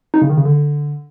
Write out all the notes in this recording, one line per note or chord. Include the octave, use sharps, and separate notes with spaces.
D#4
C#3
D#3
C#3
D3